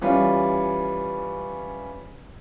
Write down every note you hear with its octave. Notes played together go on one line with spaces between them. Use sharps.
E3 G3 C#4 F4